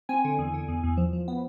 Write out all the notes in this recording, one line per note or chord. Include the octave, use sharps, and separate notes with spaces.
C4 G#5
D3
E2
D3
E2
E2
F3
F3
B3